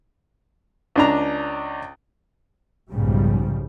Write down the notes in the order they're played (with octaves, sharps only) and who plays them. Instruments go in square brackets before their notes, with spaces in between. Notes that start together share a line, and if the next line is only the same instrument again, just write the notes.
[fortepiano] C#2 D4 A#5
[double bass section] B1 F2 G#2 C#3 F3 G3